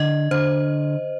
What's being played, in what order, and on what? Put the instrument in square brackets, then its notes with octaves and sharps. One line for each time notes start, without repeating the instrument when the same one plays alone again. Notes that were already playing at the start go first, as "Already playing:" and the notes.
Already playing: [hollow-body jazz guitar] D3 [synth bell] D#5
[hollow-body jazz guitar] D3 [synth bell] C5